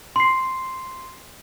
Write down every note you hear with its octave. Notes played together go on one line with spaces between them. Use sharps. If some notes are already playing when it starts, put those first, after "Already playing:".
C6 C7